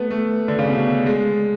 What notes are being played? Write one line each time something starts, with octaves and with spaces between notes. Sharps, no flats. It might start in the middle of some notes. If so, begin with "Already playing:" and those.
Already playing: A3 B3
A3
D3
C#3
B2
G#3